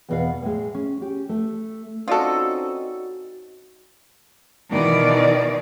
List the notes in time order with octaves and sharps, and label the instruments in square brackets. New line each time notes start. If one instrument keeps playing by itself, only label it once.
[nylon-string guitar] E2 B2 F5
A2 G#3
C#4
C#4 G4
A3
[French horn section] C4 C#4 D#4 [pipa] F4 A4 [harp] F#4 D5 D#5
[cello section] B2 D#3 E3 D5